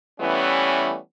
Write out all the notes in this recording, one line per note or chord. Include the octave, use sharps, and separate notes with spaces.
E3 G3 A3 B3 C#4